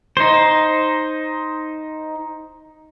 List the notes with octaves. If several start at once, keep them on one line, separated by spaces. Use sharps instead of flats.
D#4 C5